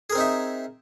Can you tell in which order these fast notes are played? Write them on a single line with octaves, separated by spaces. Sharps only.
G#4 A#4 C4 D#4 E5